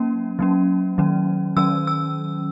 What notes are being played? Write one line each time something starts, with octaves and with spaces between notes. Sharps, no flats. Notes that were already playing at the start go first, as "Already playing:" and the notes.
Already playing: F#3 A#3 C#4
F#3 A#3 C#4
D#3 F#3 C#4
D#3 F#3 C#4 E6
E6